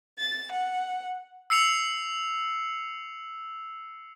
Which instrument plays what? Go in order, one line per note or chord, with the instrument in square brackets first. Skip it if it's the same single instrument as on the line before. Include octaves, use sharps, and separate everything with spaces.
[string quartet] A6
F#5
[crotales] E6 C7 C#7 F7